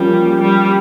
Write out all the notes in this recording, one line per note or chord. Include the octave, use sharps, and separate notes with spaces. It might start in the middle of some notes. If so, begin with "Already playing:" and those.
Already playing: F3 G3 A#3 C#4
G3